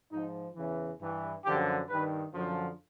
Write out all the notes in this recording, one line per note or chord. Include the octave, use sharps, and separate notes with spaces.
G#2 F3 D#4
E2 C#3 E3
G2 E3
F#2 D3 F3 G4
G2 D#3 B4
F#2 D3 F3